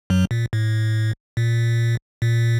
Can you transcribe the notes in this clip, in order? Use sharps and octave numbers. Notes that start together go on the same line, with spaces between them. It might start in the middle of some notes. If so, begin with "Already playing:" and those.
F#2 F#3
A#2
A2
A#2
A#2